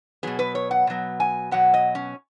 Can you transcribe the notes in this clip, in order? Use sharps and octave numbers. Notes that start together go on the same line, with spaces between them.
B2 F#3 B3 G#4
B4
C#5
F#5
B2 F#3 B3
G#5
B2 F#3 B3 F#5
D#5
C#4